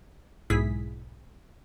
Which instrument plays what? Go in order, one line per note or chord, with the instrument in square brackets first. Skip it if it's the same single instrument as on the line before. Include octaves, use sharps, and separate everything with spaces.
[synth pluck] B1 G#2 E4 G#4 B6